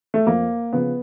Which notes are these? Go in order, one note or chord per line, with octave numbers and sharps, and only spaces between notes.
A3
F2 A#3
C#3 F3 B3